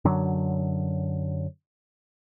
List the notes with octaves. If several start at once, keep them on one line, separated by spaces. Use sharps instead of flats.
F#2 D3 F#3